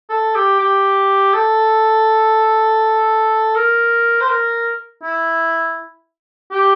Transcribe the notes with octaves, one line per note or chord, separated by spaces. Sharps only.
A4
G4
G4
A4
A#4
C5
A#4
E4
G4